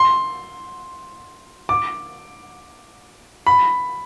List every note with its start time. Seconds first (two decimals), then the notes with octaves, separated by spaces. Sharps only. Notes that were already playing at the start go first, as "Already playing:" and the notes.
Already playing: C6
1.69 D6
3.47 B5